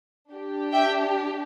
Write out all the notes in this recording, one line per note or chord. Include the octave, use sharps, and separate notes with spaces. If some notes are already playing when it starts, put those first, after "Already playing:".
D4 G4
E5 G5